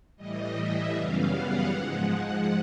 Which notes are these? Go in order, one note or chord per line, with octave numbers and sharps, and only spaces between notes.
A2 E3 G3 D#5
E5
F#2 C#3 E3 G3 B3 F5
F#5
G#2 F3 G#3